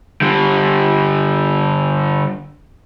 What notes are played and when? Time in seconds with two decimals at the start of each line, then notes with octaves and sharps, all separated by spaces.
0.22 D3 G3